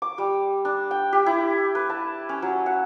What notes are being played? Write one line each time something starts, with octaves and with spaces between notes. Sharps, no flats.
D6
G3
D4
G5
G4
E4
B4
A5
C#4
F#3
F#5